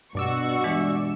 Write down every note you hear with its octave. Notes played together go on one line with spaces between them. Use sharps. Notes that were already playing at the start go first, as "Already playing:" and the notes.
G2 B2 F#4 D5 C#6 E6
E3 G#3 D4